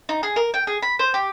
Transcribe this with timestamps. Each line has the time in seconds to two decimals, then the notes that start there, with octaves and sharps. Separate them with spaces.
0.09 D#4
0.23 G#4
0.36 A#4
0.54 G5
0.67 G#4
0.82 B5
0.99 C5
1.14 G4